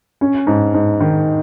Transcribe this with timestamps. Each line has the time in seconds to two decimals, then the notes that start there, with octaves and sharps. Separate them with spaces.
0.21 C#4
0.47 G#2
0.74 G#2
1.00 D#3